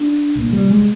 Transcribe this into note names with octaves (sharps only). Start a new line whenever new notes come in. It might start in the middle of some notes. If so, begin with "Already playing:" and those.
Already playing: D4
C2 A#2
G3
G#3